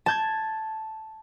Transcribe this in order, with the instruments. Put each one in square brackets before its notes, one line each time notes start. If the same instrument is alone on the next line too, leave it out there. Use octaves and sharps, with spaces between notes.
[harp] A5 G6 G#6